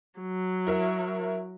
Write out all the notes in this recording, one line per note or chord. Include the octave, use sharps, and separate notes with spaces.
F#3
E4 A#4 E5